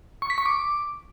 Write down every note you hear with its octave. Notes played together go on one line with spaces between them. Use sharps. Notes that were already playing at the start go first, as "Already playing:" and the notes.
C#6
B6
C#6
D6